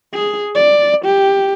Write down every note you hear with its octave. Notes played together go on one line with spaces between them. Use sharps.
G#4
D5
G4